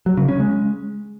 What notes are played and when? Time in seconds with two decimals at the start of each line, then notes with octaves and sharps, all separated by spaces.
0.06 F#3
0.17 C#3
0.29 C#4
0.40 G#3